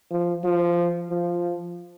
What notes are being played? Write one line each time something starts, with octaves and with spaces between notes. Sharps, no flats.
F3
F3
F3